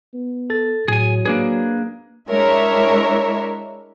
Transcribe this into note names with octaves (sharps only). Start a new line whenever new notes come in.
B3
A4 A6
A2 F#3 G#4 G#5
A#3 D4 G#4 B4
G#3 D4 E4 A#4 C#5 E5